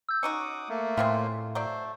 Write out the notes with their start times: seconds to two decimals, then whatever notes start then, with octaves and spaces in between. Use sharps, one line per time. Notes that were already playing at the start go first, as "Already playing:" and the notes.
0.09 E6 G6
0.23 C#4 D#4 F#4 D6 D#6 C#7
0.69 A3 A#3
0.97 A2 G#3 C4 F4 E5 F5
1.55 F#3 A3 C5 D5